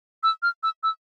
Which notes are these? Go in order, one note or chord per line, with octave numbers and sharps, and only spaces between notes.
E6
F6
E6
E6